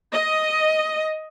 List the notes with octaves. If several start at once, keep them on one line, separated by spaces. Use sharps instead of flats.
D#5